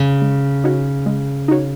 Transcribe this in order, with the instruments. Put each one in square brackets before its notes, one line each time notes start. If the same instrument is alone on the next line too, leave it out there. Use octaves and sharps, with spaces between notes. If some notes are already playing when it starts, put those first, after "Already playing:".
Already playing: [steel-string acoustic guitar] C#3
[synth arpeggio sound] G#3
D#4 F#4 C#5
G#3
D#4 F#4 C#5